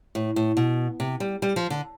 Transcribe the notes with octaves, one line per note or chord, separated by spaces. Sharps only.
A2
A2
B2
C3
G3
G3
F3
D3